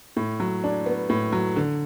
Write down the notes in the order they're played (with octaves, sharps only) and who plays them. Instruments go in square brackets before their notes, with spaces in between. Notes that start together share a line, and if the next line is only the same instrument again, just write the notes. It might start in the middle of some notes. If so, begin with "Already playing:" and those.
[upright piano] A2
F#3
D4
B3
A2
F#3
D3